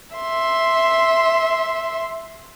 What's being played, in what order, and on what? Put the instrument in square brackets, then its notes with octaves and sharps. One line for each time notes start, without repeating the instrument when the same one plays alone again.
[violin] E5 C6